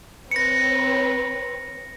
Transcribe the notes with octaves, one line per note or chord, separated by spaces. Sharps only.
C4 B4 C#5 A#6 C#7